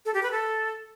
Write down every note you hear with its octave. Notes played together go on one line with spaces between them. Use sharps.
A4
G4
B4
A4